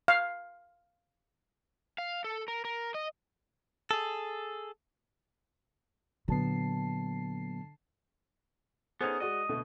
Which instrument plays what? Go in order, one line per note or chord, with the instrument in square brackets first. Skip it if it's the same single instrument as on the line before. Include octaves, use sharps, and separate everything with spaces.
[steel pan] F5
[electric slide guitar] F5
A4
A#4
A#4
D#5
[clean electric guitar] G#4 A4
[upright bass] A#2 [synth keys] D3 A5 C7 [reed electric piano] F#3 B3
[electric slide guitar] B3 C#4 D#4 [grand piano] G#4 A4 C5
[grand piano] G#3 F#4 D5 [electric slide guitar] D#5
[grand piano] B2 D3 A3